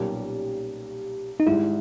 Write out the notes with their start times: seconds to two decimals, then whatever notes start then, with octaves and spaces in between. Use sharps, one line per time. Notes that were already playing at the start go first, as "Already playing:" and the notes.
Already playing: B1 A#2 G3 A#3 C#4 G4
1.40 D#4
1.47 G#1 G#2 G3 E4